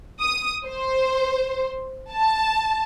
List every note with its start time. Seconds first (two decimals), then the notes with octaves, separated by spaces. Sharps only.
0.20 D#6
0.67 C5
2.10 A5